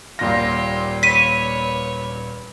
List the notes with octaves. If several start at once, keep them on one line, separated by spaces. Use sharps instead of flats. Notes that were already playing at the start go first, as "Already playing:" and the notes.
D#1 A#2 F4 G4 A#6
B4 C#5 B6 D#7